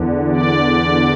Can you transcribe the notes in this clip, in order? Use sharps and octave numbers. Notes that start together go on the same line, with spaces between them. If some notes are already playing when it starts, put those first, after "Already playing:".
Already playing: E2 D3
D5